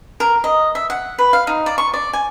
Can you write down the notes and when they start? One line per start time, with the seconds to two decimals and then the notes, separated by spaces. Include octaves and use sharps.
0.20 A#4
0.44 D#5
0.75 E5
0.90 F#5
1.18 B4
1.33 F5
1.47 D#4
1.66 D5
1.78 C#6
1.94 D5
2.13 G#5